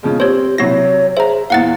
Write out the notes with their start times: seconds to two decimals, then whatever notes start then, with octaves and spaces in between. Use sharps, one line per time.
0.03 C#3 F3 G#3 B3
0.20 C4 G4 C5 C#5
0.58 C3 F#3 E4 F#4 C#5 A#6
1.17 G#4 C5 E5 A#5
1.50 E2 A#2 E4 F5 F#5 A6